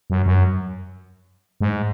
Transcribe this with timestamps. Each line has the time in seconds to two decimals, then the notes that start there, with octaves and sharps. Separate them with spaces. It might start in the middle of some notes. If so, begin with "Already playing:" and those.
0.10 F#2
0.26 F#2
1.61 G#2